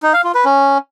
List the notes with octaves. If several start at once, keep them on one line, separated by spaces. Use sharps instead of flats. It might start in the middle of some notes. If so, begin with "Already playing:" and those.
D#4
F5
F4
B4
C#4